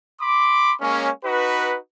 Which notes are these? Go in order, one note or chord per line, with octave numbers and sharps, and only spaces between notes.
B5 C6 D6
G#3 A#3 C#4
D#4 F#4 B4